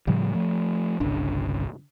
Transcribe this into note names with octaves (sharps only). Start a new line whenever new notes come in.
A2 C#3 F3 G3
F3 A3
G1 C2 C#3 D4